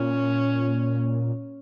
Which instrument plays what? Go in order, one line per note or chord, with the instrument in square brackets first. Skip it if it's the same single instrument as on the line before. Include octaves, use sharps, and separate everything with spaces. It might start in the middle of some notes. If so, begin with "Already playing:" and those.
Already playing: [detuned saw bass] A#2 [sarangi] C#4